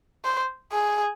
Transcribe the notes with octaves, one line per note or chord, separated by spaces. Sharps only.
C5
G#4